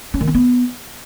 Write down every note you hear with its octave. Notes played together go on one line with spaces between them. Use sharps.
C#4
D#3
C4
B3